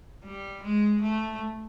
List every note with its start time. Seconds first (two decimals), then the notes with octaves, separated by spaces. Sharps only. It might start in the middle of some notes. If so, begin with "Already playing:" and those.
0.24 G3
0.63 G#3
1.02 A3